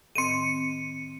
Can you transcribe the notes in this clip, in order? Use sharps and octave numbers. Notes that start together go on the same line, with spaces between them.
A2 D#3 C4 C#7 D#7